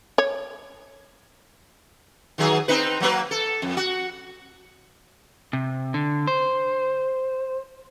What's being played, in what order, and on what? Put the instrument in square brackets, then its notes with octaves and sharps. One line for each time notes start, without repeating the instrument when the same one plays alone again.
[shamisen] C#5
[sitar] D#3 F#3 G#4
C4 D#4 B4
F#3 A#3 B4
A4
F2
F#4
[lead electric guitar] C3
D3
C5